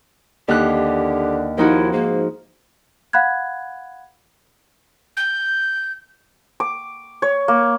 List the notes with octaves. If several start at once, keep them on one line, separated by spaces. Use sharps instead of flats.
D#2 D3 G4 F#6
D#2 F3 D#4 E4 F#4
G#2 A#3
F5 F#5 B5 F#6 G#6
G6
D6
C#5
A#3